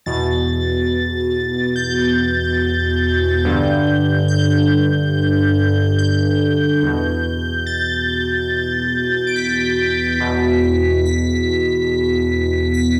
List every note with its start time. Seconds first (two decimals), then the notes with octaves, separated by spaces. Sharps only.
0.06 E2 B2 A6
1.76 G6
3.45 G2 D3
4.28 G6
5.98 G6
6.83 E2 B2
7.66 A6
9.27 D7
9.36 B6
10.20 E2 B2
11.05 B6
12.74 B6